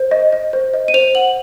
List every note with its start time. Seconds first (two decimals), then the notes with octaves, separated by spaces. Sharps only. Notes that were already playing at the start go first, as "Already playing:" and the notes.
Already playing: C5
0.11 D#5
0.33 D#5
0.53 C5
0.74 D#5
0.88 D#7
0.94 C5 F7
1.15 F#5 F#7